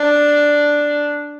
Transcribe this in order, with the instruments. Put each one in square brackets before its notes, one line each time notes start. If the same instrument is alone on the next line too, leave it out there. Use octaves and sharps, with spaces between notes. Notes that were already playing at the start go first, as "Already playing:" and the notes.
Already playing: [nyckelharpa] D4